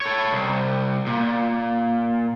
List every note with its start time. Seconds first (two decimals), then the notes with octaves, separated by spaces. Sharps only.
0.01 A4 C#5
0.33 C2
1.06 A#2